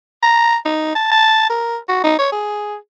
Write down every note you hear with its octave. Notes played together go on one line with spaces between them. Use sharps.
A#5
D#4
A5
A5
A#4
F#4
D#4
C#5
G#4